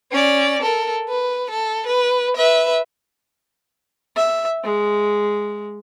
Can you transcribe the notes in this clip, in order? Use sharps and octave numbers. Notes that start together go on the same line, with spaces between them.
C#4 D5
A4 A#4
B4
A4
B4
B4 E5
E5
G#3